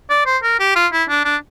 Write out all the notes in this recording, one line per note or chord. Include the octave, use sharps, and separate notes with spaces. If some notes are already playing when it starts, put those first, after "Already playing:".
D5
C5
A#4
G4
F4
E4
D4
D4